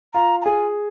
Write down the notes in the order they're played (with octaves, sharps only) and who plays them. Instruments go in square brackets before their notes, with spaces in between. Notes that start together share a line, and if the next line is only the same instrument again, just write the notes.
[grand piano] F4 [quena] A#5
[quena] A#5
[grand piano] G#4 [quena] G#5